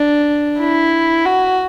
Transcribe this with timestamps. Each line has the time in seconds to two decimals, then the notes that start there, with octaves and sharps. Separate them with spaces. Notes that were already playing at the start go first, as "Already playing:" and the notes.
Already playing: D4
0.59 E4
1.25 F#4